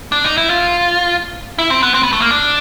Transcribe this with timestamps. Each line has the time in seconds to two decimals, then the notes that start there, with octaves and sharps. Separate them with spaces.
0.12 D4
0.24 D#4
0.38 E4
0.50 F4
1.59 E4
1.70 C4
1.83 B3
1.94 C4
2.03 B3
2.13 A3
2.22 A#3
2.31 D4